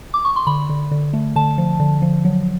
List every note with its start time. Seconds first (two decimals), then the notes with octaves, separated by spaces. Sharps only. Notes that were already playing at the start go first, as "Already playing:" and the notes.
0.14 D6
0.25 C#6
0.36 C6
0.47 D3 B5
0.69 D3
0.92 D3
1.13 A3
1.36 D3 A5
1.58 F3
1.80 D3
2.02 F3
2.25 F#3